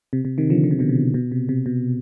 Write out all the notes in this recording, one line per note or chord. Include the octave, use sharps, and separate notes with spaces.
C3
C3
C3 D#3
D3 F3
D3
C3
B2 D3
C3
B2
C3
C3
B2